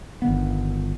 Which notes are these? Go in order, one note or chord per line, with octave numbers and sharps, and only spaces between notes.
G1 D#3 B3